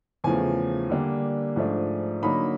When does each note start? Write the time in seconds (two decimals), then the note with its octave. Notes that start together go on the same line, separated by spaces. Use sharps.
0.24 E2 C#3 F3 A3 G#5
0.90 D3 G3 A#3 D4
1.56 G#2 F3 A3 D4
2.23 D3 F#3 A#3 D#4 B5